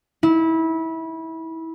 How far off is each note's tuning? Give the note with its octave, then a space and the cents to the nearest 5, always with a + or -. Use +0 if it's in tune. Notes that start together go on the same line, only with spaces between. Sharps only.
E4 -25